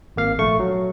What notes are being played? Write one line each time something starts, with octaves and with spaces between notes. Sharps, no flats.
G#1 A#3 F5
A#1 A3 C#6
F#3